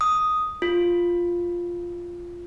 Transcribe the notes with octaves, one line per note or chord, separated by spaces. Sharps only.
D#6
F4